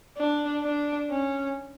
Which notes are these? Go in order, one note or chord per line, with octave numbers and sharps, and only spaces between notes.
D4
D4
C#4